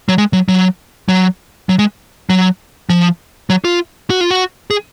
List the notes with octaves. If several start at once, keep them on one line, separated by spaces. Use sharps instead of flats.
F#3
G#3
F#3
F#3
F#3
F#3
G#3
F#3
F3
F#3
F4
F#4
F4
F#4
G#4